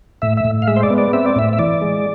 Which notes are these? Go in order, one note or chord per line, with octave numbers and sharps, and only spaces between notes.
A2 E5
E5
A2
F5
G#3 E5
C5
D5
B3
D5
C4 E5
D5
A2 E5
E5
E3 D5
G#3